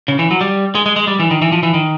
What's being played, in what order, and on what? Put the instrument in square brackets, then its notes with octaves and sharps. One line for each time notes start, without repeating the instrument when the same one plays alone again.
[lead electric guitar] C#3
E3
F#3
G3
G#3
G#3
G#3
G3
E3
D#3
E3
F3
E3
D#3